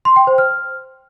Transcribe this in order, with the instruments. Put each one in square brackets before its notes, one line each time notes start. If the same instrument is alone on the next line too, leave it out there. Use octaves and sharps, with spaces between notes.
[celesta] C6
G5
C5
F6